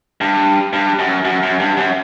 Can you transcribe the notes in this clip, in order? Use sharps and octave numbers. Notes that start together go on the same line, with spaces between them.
G2
G2
F#2
F#2
F#2
G2
F#2